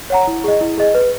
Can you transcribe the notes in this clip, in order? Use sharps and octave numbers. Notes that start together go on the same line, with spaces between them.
C#5 F#5 A#5
E4
G#4 D#5
E4
G#4 D#5
B4